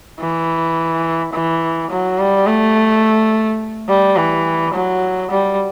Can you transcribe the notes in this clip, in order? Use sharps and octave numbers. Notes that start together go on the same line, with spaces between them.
E3
E3
F#3
G3
A3
G3
E3
F#3
G3